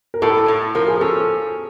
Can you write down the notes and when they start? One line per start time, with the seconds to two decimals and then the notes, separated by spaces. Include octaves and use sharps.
0.14 A#4
0.22 A2 A4
0.48 A2
0.75 F3 A#4
0.88 G#4
1.01 C#4 A4